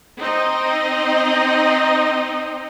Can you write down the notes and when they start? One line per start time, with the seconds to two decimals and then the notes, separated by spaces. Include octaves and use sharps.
0.19 C4 D#4 D#5